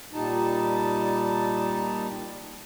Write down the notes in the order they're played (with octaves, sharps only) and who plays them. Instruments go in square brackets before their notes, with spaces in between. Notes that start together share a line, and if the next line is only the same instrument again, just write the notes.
[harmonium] A#2 G3 D#4 A5